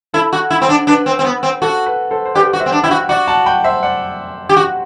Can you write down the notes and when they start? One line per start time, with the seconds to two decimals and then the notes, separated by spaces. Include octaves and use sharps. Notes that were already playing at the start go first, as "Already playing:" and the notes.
0.14 E4 A4
0.33 F#4
0.50 E4
0.61 C4
0.69 D4
0.87 D4 B4
1.06 C4
1.19 C4
1.24 B3
1.43 C4
1.62 F#4 A4
1.86 B4
2.11 A4 C5
2.25 C5
2.35 G4 B4 D5
2.53 F#4
2.60 C5 E5
2.66 C4
2.72 D4
2.84 E4 E5 G5
2.91 F#4
3.09 F#4 D5 F#5
3.28 F#5 A5
3.46 G5 B5
3.64 C5 E5
3.83 D5 F#5
4.49 G4
4.56 F#4